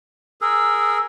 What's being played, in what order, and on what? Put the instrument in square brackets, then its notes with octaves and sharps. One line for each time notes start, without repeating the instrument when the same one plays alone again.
[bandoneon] G#4 A#4 [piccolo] E6